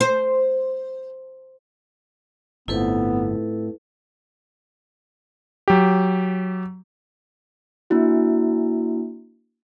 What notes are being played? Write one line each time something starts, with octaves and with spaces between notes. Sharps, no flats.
C5
G1 A2 B3 C4 E4 F4 A4 B4
F#3 G4
A#3 D4 E4 F#4